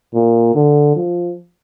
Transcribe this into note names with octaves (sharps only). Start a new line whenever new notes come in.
A#2
D3
F3